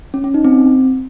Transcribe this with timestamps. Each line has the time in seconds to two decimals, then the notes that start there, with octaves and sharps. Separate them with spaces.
0.14 C#4
0.24 C#4
0.34 D#4
0.45 C4